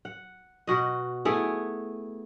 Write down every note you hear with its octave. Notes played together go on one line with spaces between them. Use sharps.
F#5
B2 F#4 D#5
A3 B3 E4 G#4